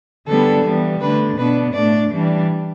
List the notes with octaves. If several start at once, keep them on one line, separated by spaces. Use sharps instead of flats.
D3 G3 B3 D4 A4
E3 G3 B3
D3 A3 D4 B4
B2 B3 D4 B4
A2 A3 D4 D5
E3 G3 D4